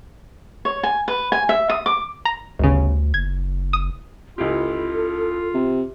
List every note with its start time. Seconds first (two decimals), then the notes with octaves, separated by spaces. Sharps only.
0.65 C#5
0.83 G#5
1.08 B4
1.32 G#5
1.49 E5
1.70 D#6
1.86 D6
2.25 A#5
2.59 G1 D2 C#3
3.14 F#1 G#6
3.73 D#6
4.38 C#2 E4 F4 G4 A4
5.54 C3